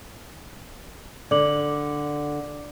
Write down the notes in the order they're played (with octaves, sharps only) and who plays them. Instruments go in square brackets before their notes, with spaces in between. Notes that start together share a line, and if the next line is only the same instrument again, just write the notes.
[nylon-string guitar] D3 [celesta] D5 D6 F#7